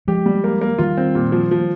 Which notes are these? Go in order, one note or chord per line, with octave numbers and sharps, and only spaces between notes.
F3 G#3 G4
G3
A#3
A#3
D#3 G3 F4
C4
A#2
F3
F3